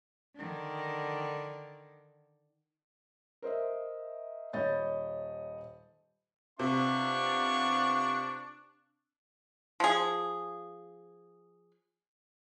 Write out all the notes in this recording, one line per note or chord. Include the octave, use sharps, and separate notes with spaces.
D3 D#3
A#4 C5 D#5 E5
D#1 C#5 D#5 B5 G6 A6
C3 B3 D4 F4 C#6
F3 G#4